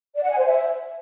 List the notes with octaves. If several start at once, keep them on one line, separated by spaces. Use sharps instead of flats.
D5
F#5
G#5
C5
E5